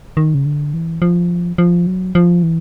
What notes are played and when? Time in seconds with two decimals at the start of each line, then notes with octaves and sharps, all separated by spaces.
0.17 D#3
0.35 C#3
0.46 D3
0.74 E3
1.02 F3
1.58 F3
1.87 F#3
2.15 F3
2.43 E3